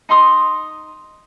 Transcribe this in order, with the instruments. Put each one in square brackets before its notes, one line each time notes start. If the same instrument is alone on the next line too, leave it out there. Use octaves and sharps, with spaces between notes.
[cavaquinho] D#4 A#5 C6 D#6